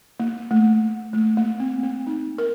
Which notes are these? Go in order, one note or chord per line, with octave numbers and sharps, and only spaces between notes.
A#3
A3
A3
A#3
C4
C4
D#4
A#4